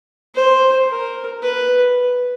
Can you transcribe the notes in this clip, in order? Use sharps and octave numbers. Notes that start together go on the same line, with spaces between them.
C5
A#4
B4